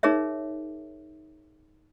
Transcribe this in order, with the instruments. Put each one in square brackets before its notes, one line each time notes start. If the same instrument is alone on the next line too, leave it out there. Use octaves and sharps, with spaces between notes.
[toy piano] D#4 G#4 A#4 C#5 E5